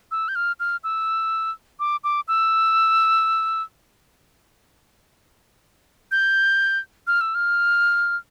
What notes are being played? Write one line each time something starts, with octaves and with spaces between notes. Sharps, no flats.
E6
G6
F6
F6
E6
D6
D6
E6
G6
F6
E6
F6